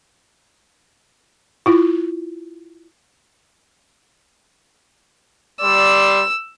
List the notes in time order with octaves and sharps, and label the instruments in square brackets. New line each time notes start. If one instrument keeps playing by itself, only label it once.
[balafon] E4 F4
[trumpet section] G3 D5 C6 [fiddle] E6